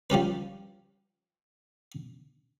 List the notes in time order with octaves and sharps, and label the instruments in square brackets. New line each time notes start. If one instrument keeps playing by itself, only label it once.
[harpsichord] F3 G3 C#4 B4